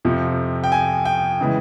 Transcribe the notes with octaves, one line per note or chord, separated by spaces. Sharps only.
F2 C3 F3
G5
G#5
G5
C#3 E3 G#3